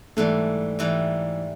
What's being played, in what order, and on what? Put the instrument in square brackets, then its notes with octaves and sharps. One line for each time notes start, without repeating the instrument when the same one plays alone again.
[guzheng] G#2 E3 G3 [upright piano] A3
[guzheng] G#2 E3 G3